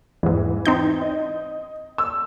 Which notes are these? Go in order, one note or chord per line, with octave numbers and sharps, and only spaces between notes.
E2 G#2 E3
C4 D#4 G6
D#5
E6